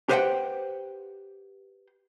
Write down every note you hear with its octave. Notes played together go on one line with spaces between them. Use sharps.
G4 B4 C5 D#5 F#5 G5